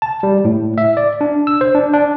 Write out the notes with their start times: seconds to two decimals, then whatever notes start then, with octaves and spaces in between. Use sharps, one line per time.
0.02 A5
0.23 G3
0.45 A2
0.78 E5
0.97 D5
1.21 D4
1.47 E6
1.61 C5
1.75 D4
1.94 D4